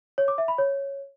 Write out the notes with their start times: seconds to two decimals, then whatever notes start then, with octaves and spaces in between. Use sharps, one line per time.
0.18 C#5
0.28 D6
0.38 E5
0.48 B5
0.58 C#5